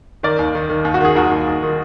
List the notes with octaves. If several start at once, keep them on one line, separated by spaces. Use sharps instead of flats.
D#3 A#4 D5
D#2
D#3
D#3
D#2
F#4
D#3 G#4
D#2 F#4 A#4
D#2
D#2
D#3